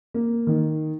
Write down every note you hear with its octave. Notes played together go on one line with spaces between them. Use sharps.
A#3
D#3